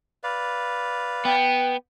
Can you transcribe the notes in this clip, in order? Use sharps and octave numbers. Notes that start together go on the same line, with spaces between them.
B4 D5 F5
B3 G5